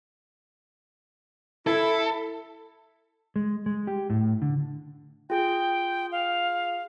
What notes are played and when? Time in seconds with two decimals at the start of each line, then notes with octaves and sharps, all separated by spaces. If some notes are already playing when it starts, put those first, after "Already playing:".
1.67 E4 A4
3.36 G#3
3.66 G#3
3.87 G4
4.10 A2
4.42 D3
5.30 F4 G#4 G5
6.12 F5